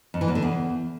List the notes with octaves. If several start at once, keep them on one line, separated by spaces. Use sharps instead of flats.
F2
E3
E2
D3
E2